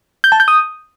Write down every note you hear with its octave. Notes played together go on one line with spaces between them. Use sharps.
G6
A5
G6
D#6